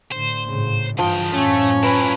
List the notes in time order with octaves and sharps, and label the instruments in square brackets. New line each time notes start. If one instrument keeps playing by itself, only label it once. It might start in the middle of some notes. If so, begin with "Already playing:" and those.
[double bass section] A2 D3 [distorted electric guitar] C5
[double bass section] G#1 A2 C#3
[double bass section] G2 E3 [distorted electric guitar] C#3 G5 [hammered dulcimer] F3
[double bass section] F#2 A2 [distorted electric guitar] A3 [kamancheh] C#4
[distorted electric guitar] E4 A#4 [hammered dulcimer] B4